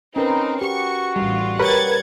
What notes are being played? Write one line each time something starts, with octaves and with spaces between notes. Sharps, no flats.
C4 C#4 D#4 A#4 B4
F#4 G4 C#6
A1 G3 F4
G4 A#4 B4 C#5 F#5 G#6 A6